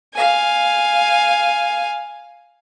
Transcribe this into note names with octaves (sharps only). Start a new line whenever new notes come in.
F5 G#5